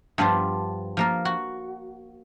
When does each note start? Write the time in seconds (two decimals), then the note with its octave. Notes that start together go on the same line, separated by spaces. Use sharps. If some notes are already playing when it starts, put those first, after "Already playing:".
0.18 G2 F3 B3 D4 C5
0.97 F3 A#3 A#4
1.25 F#4